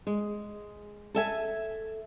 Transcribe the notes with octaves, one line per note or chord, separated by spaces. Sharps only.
G#3
A4 E5 G#5